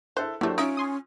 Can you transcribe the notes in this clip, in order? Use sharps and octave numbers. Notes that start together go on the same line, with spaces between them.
E4 A4 C5 F#6
D3 F#3 A3 A#3 D4 E4 G4 C5
C#4 D#4 F4 E5 D7
G#5 C6 D#6